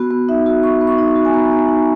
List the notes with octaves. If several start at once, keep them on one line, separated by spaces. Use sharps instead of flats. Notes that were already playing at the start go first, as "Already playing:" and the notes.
Already playing: B3 F#4
B3
D#4 E5
F#4
B3 C#6
B3
C#6
D#4
C#6
F#4
G#5
B3 A#5
B3
D#4